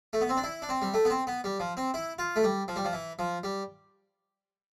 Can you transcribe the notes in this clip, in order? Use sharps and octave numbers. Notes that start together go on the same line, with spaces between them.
A3
B3
C4
D4
E4
D4
C4
G3
A3
B3
C4
B3
G3
F3
C4
E4
F4
A3
G3
F3
G3
F3
E3
F3
G3